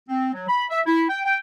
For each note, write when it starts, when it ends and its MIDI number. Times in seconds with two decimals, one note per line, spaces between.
0.09 0.31 60
0.33 0.45 54
0.48 0.65 83
0.70 0.80 76
0.86 1.04 64
1.09 1.22 79
1.25 1.36 79